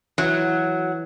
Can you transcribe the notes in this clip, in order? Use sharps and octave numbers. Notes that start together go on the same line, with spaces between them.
E3 F#3